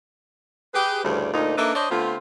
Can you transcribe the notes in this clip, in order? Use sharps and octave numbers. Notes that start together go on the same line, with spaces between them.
G4 G#4 B4
D2 G2 C#3 E3 G3 D4
D2 A#2 D#4
A#3 D4 D#4 A4 B4 E5
D4 C5 C#5 D#5
D3 A3 B3 C4 F4